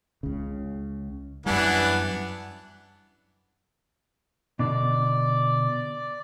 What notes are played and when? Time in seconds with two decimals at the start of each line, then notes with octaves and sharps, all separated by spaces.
0.23 C#2 C#3
1.46 F#2 E3 G3 B3 D4
4.59 B2 D3 D5